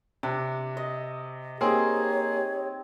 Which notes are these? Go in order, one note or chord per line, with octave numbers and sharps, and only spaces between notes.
C3 D4
D#5
A#3 C4 D#4 G4 G#4 C#5